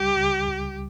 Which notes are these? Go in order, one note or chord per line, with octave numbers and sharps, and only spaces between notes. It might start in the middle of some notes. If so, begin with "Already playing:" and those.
Already playing: C#2 G3 G4
C#2
C#2